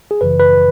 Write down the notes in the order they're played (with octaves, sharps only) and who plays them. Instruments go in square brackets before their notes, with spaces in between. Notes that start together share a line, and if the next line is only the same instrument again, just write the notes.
[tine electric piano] G#4
G#1 F#2 C#3 E3 B4
B4